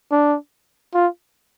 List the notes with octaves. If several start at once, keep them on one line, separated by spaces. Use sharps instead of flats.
D4
F4